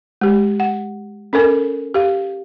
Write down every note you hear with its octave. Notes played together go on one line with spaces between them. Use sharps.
G#3 G4
F#5
C#4 A4 A#4 G#5
G4 F5